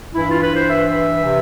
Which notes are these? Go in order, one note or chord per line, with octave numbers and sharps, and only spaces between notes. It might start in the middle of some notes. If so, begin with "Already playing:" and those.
G2 E3 E4
F4
B4
C5
E5
C3 E3